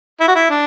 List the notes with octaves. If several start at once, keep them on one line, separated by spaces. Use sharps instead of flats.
E4
F#4
E4
D4